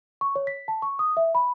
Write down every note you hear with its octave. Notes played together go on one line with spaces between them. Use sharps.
C#6
C#5
B6
A5
C#6
D#6
E5
B5